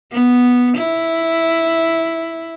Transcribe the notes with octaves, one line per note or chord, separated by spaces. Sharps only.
B3
E4